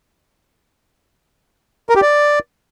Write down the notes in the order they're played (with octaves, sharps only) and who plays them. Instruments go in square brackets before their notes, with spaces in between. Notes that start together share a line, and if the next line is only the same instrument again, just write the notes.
[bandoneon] A#4
G4
D5